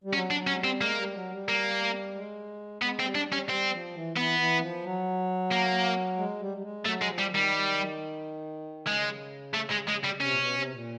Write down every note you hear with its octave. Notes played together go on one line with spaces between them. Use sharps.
G3
F#3 C#4
D4
F#3
C#4
G#3
G3
C4
G#3 A#3
G3
F#3
G3
A#3
G#3
G#3 B3
C4
G3
D4
G3
C#4
G3 C4
F3
E3
E3 B3
E3
F3
F#3
A#3
G#3
G3
G3
G#3
F#3 A3
G#3
F3
G3
D#3
G3
C#3 G#3
A3
G#3
G#3
G3
C#3
C3 C#4
A#2
B2
C3
A#2